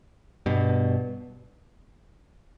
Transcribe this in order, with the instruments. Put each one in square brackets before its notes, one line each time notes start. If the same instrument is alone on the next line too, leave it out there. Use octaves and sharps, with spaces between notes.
[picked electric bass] G2 B2